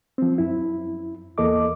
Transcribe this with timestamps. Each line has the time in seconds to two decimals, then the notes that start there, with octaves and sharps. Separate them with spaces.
0.18 F3 C4
0.38 F#2 E4
1.38 E2 A#3 A4 D#5 D6